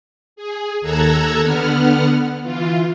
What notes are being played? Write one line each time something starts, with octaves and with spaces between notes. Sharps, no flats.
G#4
D#2 A4 A#5 E6 F#6 G#6
D3 B3 F#5 F6
E3 F4